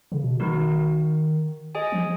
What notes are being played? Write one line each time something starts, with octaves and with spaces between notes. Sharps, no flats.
C#3
B2
D#3 A#3 D#4 F#4 A#4
G#4 D#5 G#5
F3